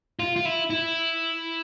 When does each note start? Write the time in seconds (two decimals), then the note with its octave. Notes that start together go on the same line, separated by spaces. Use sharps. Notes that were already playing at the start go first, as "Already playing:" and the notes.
0.19 F4
0.36 F4
0.45 E4
0.70 E4